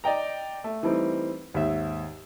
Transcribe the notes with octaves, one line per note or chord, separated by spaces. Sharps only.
D5 D#5 G5 A#5
A3
E3 G3 A3 C4 D#4
D#2 G#2 E5